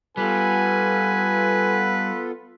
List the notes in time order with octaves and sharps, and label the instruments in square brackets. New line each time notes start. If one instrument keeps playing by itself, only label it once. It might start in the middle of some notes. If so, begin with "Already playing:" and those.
[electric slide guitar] G3 [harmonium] B3 F4 A4 [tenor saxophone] B4 [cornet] G#5